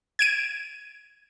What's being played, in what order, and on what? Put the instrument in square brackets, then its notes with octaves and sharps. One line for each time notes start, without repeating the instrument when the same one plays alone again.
[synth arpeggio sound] G#6 D7 D#7